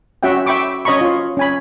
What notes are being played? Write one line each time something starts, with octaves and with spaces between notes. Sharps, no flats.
C#4 F#4 E5 F#5 G5
E5 G5 B5 C#6 D6
C#4 C#5 D#5 A#5 B5 C#6
F4
C#4 G#5 B5